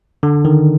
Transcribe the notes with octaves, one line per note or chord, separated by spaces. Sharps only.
D3
D#3